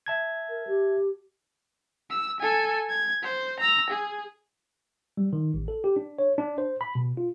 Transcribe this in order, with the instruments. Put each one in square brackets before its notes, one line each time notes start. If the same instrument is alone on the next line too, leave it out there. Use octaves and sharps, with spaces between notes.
[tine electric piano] E5 A5 G#6
[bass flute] A#4
G4
[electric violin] E6
A4 G#5
G#6
C5
A#5 E6
G#4
[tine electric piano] G3
D#3
A1
A4
G4
D4
C#5
D4
C5
B5
B2
F4